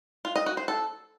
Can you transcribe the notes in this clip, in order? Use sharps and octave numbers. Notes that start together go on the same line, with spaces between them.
F4
D#5
F#4
C5
A4